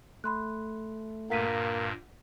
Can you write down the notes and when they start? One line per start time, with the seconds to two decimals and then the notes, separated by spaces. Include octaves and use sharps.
0.24 A3 B5 C6 F#6
1.30 G2 A#2 A#3 F#5 B6 D#7